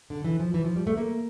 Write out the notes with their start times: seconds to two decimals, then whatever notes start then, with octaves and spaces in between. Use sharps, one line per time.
0.10 D3
0.24 E3
0.39 F3
0.54 E3
0.65 F3
0.76 G3
0.87 A3
0.97 A#3